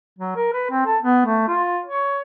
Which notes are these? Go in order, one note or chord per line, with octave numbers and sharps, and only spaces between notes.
F#3
A#4
B4
C4
A4
B3
A3
F4
C#5